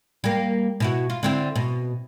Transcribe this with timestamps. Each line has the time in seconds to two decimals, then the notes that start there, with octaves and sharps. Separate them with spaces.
0.24 G3 A#3
0.80 B2 E4 F#4
1.10 F4
1.23 D3 C4 E4
1.56 B2